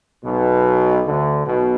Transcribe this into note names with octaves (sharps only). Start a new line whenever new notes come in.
B1 B2
D2 D3
B1 B2